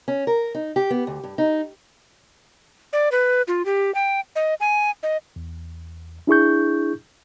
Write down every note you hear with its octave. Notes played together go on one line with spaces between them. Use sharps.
C#4
A#4
D#4
G4
B3
D2
G2
D#4
D5
B4
F4
G4
G5
D#5
G#5
D#5
E2
D4 E4 G#4 C#6 G6